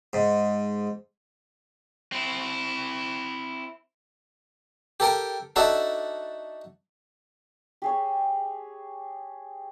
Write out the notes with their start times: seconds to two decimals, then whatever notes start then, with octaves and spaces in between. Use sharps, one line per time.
0.13 G#2
2.12 C4 E4
5.00 G4 A4 A#4 G5
5.56 D4 D#4 F#4 A4 E5
7.82 G4 G#4 C#5